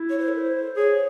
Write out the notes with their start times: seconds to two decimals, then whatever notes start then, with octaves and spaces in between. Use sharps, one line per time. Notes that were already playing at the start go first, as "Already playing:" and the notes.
Already playing: E4
0.10 C#5
0.19 C5
0.28 A4
0.38 C5
0.77 G#4 C#5